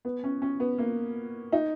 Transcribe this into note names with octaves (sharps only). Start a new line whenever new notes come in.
B3
C#4
C#4
B3
A#3
D#4